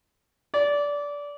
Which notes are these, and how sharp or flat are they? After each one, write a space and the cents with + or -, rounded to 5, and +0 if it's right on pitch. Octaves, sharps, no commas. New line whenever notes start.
D5 -20